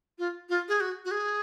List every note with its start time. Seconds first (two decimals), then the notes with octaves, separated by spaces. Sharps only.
0.19 F4
0.49 F4
0.69 G#4
0.80 F#4
1.05 F#4
1.11 G#4